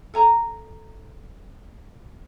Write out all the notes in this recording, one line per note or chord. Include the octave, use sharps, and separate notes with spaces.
A4 G#5 A#5